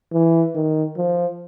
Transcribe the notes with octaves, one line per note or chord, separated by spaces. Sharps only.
E3
D#3
F3